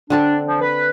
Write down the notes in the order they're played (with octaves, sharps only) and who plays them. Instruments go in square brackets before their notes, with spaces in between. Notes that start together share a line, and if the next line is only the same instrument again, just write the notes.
[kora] D3 C4 A4 [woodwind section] D4
[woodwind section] F3
B4